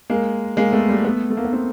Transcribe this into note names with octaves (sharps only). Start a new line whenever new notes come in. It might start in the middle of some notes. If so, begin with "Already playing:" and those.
G#3 A#3
G#3 A#3
A3 B3
G3 A3
A3 B3
A3
A#3
B3
A#3 C4